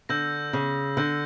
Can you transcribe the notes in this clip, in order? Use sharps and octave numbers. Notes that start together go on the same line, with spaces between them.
D3 E6 G6 A#6
C#3
D3 E6 G6 A#6